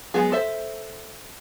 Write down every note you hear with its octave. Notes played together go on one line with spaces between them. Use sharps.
F#3 G#3 B3 G#4
A4 C5 E5